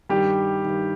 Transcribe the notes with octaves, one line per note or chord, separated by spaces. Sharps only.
G2 D#3 G3 G4
G2 D#3